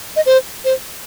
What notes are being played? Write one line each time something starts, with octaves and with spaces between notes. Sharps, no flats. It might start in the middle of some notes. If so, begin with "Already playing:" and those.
D#5
C5
C5